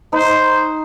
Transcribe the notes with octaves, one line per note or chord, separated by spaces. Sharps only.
D#4 C5